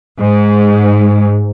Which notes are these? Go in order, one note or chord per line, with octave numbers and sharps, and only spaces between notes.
G#2